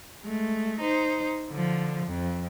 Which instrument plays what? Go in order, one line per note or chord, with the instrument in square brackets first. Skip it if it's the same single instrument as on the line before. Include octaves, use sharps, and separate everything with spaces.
[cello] G#3 A3
D#4 C5
D3 F3
F2